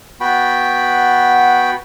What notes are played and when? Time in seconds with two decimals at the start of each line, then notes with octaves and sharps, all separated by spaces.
0.21 B3 F#4 G5 B5